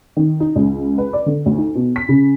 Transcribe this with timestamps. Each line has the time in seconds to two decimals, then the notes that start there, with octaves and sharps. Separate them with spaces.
0.17 D#3
0.40 D#4
0.56 C#2
0.98 B4
1.13 D5
1.26 D3
1.46 D2
1.58 D#4
1.75 B2
1.96 B6
2.08 C#3